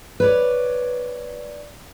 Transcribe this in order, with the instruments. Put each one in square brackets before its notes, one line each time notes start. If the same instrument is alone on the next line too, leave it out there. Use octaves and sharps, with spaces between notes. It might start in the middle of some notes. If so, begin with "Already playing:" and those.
[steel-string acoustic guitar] B4 C#5 D5